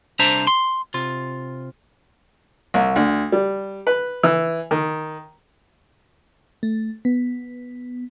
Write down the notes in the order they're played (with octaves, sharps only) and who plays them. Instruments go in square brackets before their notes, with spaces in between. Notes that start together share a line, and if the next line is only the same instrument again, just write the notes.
[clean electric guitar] C2 D4 C5 E5 A#5
C6
C3 F4
[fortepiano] C2
D2
G3
B4
E3
D#3
[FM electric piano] A3
B3